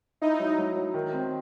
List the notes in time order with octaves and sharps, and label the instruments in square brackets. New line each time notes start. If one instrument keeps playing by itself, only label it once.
[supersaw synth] D#4 [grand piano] E4
[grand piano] F#3
F#3
F#3
D#3
C4